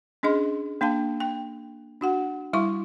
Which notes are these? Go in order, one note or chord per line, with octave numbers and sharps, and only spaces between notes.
C#4 D4 G#4 D#5 C6
A#3 D4 F5 A5
G5
D4 F#4 F#5
G3 E4 F5 C6 C#6